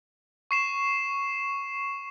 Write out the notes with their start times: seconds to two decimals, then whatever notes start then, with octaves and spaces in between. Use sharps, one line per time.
0.51 C#6 C7 E7